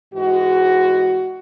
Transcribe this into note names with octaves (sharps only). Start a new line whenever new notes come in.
G#2 E3 G#3 F#4